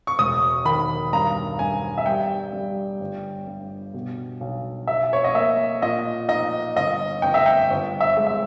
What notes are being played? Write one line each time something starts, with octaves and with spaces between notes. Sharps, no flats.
C#6
E1 D#6
D#3 B5
G2 A#5
G2 G#5
E5
G3 G5
G3
G1
G2
B2
B1
B1 E5
C#5
D#5
A#3 E5
A#2 D#5
D#4 D#5
G1 D#5
G1 G5
E5
G5
G1
E5
G#3
E5